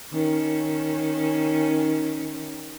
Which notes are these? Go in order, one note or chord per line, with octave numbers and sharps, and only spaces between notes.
D#3 C#4